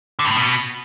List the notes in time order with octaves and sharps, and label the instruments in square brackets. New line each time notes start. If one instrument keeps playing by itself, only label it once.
[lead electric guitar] D3
G2
A2
B2